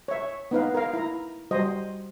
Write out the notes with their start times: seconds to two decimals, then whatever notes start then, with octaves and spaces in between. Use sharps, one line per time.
0.08 C#5 E5
0.51 B3 D#4 B4 F5
0.75 A#4 F5
0.93 E4 A#5
1.51 G3 F#4 C5 D#5